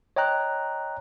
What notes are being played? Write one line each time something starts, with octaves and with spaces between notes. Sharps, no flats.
C#5 D#5 G5 A#5 F#6